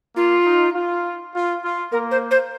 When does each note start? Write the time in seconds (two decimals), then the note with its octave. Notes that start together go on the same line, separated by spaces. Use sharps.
0.15 A#3 F4
0.45 D#4
0.74 F4
1.34 F4
1.63 F4
1.92 A#3 A#4
2.11 C5
2.31 C5